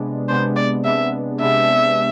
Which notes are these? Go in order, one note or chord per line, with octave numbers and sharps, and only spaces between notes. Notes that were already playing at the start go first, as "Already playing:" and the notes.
Already playing: C3 G#3 B3 D4
C3 G#3 B3 D4 C5
D5
C3 G#3 B3 D4 E5
C3 G#3 B3 D4 E5